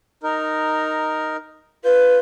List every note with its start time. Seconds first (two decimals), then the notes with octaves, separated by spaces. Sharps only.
0.23 D#4 A#4
1.85 F4 B4 G6